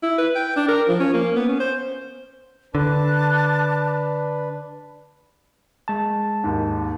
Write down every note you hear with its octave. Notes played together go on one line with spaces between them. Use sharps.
E4
B4
G5
D4
A#4
F3
C#4
A#3
B3
C#4
C5
D3 D4 B4 A5 D6 F#6
G#3 A5
D#2 G#2